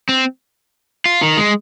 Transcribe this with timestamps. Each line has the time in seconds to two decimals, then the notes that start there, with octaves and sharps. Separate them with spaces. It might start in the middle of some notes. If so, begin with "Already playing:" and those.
0.09 C4
1.05 F4
1.22 D#3
1.37 G#3